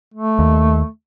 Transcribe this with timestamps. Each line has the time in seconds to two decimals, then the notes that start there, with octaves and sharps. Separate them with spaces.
0.14 A3
0.39 D#2